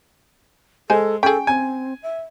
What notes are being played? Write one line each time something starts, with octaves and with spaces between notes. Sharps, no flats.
G#3 A4 C5 G#5
C#4 G#4 A4 G5
C4 G#5
E5